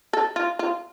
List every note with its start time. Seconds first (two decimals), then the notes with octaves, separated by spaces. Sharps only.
0.13 A4
0.36 F4
0.59 F4